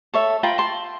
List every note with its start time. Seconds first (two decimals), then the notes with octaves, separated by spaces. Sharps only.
0.14 A4 C#5 E5
0.43 F4 A#4 G5 B5
0.58 A5 C6